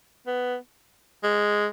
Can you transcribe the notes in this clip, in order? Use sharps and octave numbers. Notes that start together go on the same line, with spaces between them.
B3
G#3